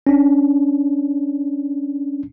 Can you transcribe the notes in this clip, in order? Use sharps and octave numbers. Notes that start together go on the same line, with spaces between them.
C#4 D4